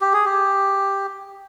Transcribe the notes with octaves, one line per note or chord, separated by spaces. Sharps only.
G4
G#4
G4